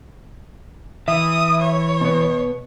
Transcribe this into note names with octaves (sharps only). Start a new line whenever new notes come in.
E3 E5 D#6
C#5
B2 B3